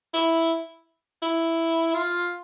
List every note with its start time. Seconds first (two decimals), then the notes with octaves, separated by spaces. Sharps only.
0.14 E4
1.22 E4
1.94 F4